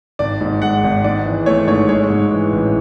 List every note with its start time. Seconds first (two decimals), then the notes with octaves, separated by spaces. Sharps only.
0.19 G#1 D5
0.41 G#2
0.62 G#3 F#5
0.84 G#1
1.04 G#2 D5
1.25 E3
1.46 A3 C#5
1.68 G#2 C#5
1.89 G#3 C#5
2.10 G#2
2.31 E3
2.52 A1